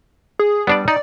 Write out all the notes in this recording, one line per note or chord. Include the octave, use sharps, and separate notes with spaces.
G#4
G3 B3 D4 D5
D#4 D5